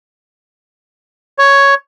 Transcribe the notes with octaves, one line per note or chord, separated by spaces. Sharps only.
C#5